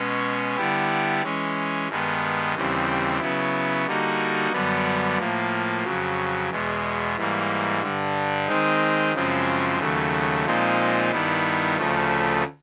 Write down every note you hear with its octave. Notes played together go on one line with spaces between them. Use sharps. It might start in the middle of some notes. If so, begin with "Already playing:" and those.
Already playing: B2 G#3 C#4
D3 G3 B3 E4 G4
E3 G#3 C#4
G2 D#3 G#3 B3
D#2 C#3 E3 G3 C4
C#3 F#3 B3 E4
D3 G3 A#3 D#4 F#4
F#2 D3 G3 B3
A2 F3 A#3
F2 C#3 F#3
E2 B2 G#3
G#2 E3 G3 A#3
G2 D3 G3
D#3 G#3 C4 D#4
F#2 C#3 F3 G#3 C4
D#2 C#3 F#3 A3
A#2 F3 G#3 C4 D#4
G2 D#3 G3 B3 E4
D2 C#3 F3 A3